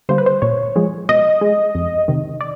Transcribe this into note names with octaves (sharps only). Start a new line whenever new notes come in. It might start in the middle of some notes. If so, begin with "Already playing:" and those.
D3 G3 A#3 C5
B4
C5
A#2 C#5
F3 G#3
B2 D#5
G#3
F2
C3 D#3
D5